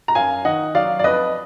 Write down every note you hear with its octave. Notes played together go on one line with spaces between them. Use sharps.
A#5
F#2 F5 G#5
D#3 D#5 F#5
F#3 D5 F5
D5
F2 B4 D#5